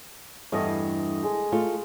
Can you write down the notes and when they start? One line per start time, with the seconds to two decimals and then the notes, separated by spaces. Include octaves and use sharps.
0.52 E2 G2 A3 D#5
1.24 G#3
1.52 A3 F4